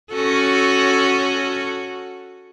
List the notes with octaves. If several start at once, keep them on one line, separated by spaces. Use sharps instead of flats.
C#4 F#4 A4